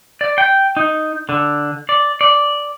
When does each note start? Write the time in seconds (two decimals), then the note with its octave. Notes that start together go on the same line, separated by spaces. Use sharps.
0.21 D5
0.38 G5
0.77 D#4
1.29 D3
1.89 D5
2.21 D5